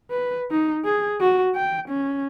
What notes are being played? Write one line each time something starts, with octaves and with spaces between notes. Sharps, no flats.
B4
D#4
G#4
F#4
G5
C#4